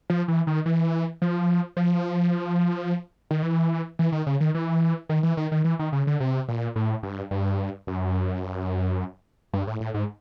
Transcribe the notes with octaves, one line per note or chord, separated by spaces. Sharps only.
F3
E3
D#3
E3
F3
F3
D#3
E3
E3
D#3
C#3
D#3
E3
D#3
E3
D#3
D#3
E3
D#3
C#3
D3
C3
A#2
A2
G2
G2
F#2
G2
A2
A2
G#2